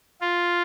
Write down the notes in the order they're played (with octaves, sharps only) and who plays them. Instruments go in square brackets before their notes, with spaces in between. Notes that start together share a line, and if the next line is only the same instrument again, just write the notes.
[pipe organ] F4